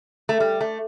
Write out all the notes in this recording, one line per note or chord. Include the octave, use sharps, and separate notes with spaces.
A3
G3
A3